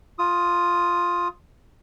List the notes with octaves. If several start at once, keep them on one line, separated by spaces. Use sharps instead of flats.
F4 D#6